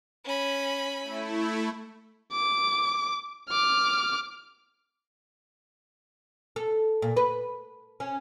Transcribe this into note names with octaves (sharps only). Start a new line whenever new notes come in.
C#4 B5
A3 E4
D6
D6 F6
A4
A#2
B4
C#4